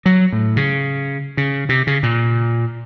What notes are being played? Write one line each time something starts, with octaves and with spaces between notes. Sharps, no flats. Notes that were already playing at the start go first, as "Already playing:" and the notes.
F#3
A2
C#3
C#3
C3
C#3
A#2